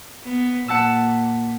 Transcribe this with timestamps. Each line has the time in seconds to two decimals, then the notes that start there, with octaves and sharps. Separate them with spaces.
0.24 B3
0.68 A#2 F#5 A5 E6